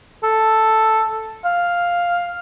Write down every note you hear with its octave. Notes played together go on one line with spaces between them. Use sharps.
A4
F5